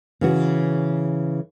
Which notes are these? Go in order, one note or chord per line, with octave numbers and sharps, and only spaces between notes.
C#3 E3 F#4